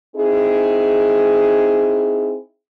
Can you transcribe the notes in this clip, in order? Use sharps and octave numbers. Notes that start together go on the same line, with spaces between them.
C4 D#4 E4 G#4